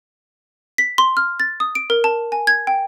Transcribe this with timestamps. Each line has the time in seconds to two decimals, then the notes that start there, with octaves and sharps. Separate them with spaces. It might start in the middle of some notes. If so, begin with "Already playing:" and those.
0.78 B6
0.98 C6
1.17 F6
1.40 A6
1.60 D#6
1.75 D7
1.90 A#4
2.04 A5
2.32 G#5
2.47 G#6
2.67 G5